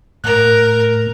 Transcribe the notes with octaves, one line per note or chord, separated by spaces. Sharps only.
A2 A#4 F#6 F7